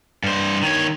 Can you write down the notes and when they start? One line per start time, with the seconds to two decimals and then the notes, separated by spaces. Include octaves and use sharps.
0.24 G2 C5
0.62 D#3 C#5